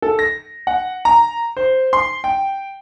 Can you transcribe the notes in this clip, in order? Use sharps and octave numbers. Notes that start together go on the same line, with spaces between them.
A4
A#6
F#5
A#5
C5
C6
G5